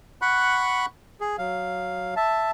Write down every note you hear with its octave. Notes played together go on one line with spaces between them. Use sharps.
F#5 B5 C#6 F#6
G#4
F#3 F5
E5 A5